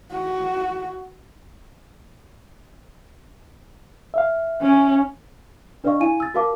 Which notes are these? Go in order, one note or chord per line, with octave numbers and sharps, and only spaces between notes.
F#4
E5 F5
C#4
D4 B4 D5 D#5 F5 C#6
E4 F5 G#5 D#7
E6 A6
F#4 A#4 B4 F5 A5 D6